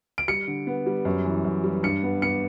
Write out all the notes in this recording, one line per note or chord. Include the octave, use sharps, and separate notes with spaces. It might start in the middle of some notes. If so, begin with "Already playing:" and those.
D7
G3 C#7
D3
B3
G3
F#2
E3
F#2
G3
G2 C#7
B3
B3 C#7